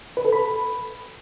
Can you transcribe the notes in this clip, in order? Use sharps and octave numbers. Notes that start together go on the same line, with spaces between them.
B4
A4
B5